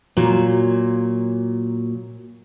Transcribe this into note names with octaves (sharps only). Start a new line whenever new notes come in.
A#2 F#3